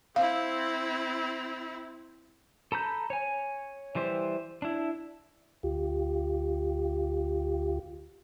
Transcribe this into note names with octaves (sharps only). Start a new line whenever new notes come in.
C4 E4 F5
A4 A#5 B5 G6
C#5 G#5
E3 G3 C5 E5
D4 E4
D2 F4 G4